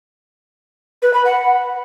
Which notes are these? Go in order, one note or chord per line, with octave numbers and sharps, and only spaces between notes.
B4
B5
F#5